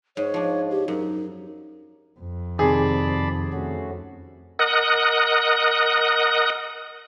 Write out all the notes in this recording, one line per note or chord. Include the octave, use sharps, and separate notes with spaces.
G#2 C#5
F3 D4
G4
F#2 D#4
F2
C3 D#3 G#4 D5 A5 B5
A3 C#4 F#4
A#4 D#5 F#5 D#6 F#6